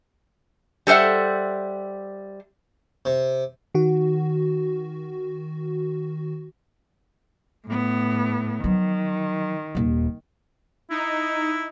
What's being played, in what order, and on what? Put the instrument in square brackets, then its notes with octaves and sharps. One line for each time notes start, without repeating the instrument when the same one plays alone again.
[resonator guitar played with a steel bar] G3 A4 C5 E5 F#5
[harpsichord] C3
[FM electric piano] D#3 F#4
[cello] A2 B3
[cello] D#3 [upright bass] F3 F#3
[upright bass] D#1 D#2
[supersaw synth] D#4 [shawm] E4